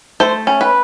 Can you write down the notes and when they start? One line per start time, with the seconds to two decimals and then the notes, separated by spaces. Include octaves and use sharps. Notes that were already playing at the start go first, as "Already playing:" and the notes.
0.20 A3 C5
0.47 C#4
0.61 B4